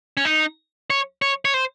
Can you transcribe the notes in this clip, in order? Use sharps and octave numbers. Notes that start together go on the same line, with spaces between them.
C#4
D#4
C#5
C#5
C#5
C5